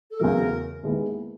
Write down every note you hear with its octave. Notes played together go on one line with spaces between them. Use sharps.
A4
E2 C#3 F#3 A3 A#4
D#2 D#3 G#3 B3 E4